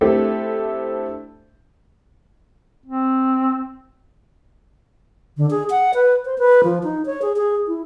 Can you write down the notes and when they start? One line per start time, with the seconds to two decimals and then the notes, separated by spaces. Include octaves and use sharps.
0.01 A3 C4 D4 E4 G4 A4
2.86 C4
5.37 D3
5.50 G#4
5.70 F#5
5.94 B4
6.25 C5
6.38 B4
6.64 F3
6.83 D#4
7.06 C#5
7.22 G#4
7.37 G#4
7.67 E4